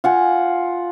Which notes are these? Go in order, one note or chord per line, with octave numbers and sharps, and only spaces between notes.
F4 F#5 G#5